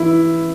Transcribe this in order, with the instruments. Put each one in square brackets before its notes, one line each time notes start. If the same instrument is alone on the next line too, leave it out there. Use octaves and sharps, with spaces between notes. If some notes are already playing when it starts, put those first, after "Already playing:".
Already playing: [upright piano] E3 E4